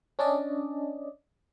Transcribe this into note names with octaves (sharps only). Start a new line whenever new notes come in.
C#4 D4 D5 D#5